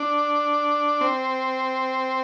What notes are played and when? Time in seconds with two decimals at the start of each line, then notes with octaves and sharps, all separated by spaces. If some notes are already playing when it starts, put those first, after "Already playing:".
Already playing: D4
1.01 C4